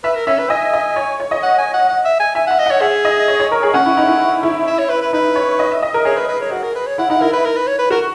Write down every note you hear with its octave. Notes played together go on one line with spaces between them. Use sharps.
B4 E5
A#4
C#4 E5
B4
D#5 G#5
D#5
C#5
C#5
D#5
F#5
G#5
F#5
F#5
E5
G#5
E5 G#5
F#5
E5
D#5
C#5 F#5
G#4 E5
D#5
C#5
C#5
A#4
G#4
C#4 F#5
E4
D#4
E4
E4
E5
C#5
B4
B4
D#4 B4
C#5
D#5
E5
D#5
A#4
G#4 C#5
B4
B4
C#5
F#4
A#4
B4
C#5
E4 F#5
D#4 F#5
E4 A#4
B4
A#4
B4
C#5
B4
F#4 A#4